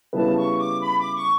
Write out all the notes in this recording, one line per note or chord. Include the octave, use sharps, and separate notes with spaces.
C#3 G3 B3 E4 B4 A5
C#6
D6
B5
D6
C#6